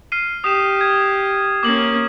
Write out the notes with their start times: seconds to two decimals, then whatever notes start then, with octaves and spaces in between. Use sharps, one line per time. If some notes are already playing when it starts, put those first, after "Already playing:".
0.12 F6 C7 D#7
0.44 G4 D#6 E7
0.81 G#6
1.63 A#3 C#4 D6 F#7